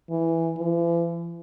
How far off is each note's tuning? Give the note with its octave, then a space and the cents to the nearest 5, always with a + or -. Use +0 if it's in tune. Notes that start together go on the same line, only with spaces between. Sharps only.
E3 +0
E3 +45